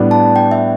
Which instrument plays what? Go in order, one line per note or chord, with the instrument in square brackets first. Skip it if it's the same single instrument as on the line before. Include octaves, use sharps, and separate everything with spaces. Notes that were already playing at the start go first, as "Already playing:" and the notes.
Already playing: [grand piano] A2 G3 B3 D4
[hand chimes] A5
G5
E5